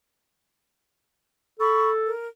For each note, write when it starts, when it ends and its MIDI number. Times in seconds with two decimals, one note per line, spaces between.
1.60 2.11 69
1.60 1.90 83
1.60 1.90 85
2.05 2.26 70